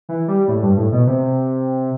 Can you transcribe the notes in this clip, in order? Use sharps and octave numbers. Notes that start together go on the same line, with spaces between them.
E3
G3
A2
G2
A2
B2
C3